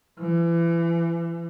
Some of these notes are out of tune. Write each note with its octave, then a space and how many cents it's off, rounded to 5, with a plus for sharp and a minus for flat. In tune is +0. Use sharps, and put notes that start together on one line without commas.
E3 +30